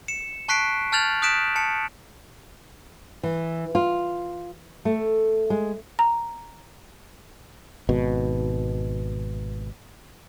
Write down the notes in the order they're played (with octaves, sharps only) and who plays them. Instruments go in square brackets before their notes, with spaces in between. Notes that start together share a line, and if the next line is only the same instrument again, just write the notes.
[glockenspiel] C#7 E7
A5 C#6 F#6 B6 C7 D7
A5 F6 G6 A6 F7 F#7
D#6 F#6 G6 B6 D7 E7
A5 C#7
[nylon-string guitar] E3
F4
A3
G#3
[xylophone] A#5
[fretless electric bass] G#1 B2